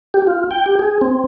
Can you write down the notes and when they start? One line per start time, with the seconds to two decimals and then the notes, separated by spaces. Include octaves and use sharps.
0.14 G4
0.27 F4
0.51 G5
0.66 G4
0.79 G#4
1.01 C4